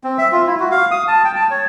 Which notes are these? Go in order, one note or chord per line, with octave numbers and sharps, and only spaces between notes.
C4
E5
F4
E4
F#4
F5
D#6
A5
G5
A5
C#5